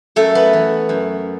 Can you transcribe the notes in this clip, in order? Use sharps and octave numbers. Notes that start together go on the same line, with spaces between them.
F#2 A3 A4
B3 B4
E3
F#2